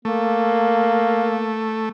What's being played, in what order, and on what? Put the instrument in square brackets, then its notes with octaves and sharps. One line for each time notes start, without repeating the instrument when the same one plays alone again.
[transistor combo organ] A3 [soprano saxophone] A#3